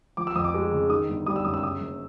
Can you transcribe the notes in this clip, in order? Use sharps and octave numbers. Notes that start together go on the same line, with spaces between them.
F3 D6
E6
F2 D#6
D6
G#3
C#3
D#3 D#6
G1
G3 D#6
E6
F#2 D#6
E6
C#3 D#6
F#1